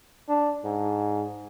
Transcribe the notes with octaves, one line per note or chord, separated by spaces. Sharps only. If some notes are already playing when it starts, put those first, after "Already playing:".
D4
G#2